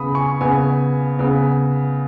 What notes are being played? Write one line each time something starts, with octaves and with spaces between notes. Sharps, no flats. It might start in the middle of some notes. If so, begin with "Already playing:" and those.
Already playing: C#3 B3 B5 D#6
G#5 C#6
C#3 B3 G#5
C#3 B3